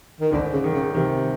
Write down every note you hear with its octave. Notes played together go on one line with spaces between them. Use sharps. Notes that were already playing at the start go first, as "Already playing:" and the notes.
D#3
G#1 D3
C#3
D#3
C#3
C3 D#3